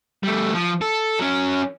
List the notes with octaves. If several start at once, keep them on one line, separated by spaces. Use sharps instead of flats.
G3 A3
F3
A4
F#3 C#4